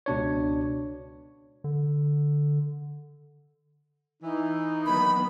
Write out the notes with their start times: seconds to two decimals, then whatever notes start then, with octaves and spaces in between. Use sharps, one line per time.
0.06 C#2 B2 D4 C#5
1.64 D3
4.22 E3 D#4
4.86 D#3 F#3 B3 B5